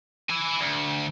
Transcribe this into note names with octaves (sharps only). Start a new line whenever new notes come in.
E4 G#5
D2